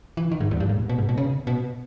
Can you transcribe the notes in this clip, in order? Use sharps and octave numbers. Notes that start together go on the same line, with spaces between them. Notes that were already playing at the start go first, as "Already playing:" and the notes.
E3
D#3
G#2
E2
G2
G#2
A#2
B2
G#2
B2
C#3
B2